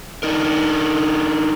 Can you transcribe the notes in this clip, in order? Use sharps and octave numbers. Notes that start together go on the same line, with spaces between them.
D4 D#4 A#4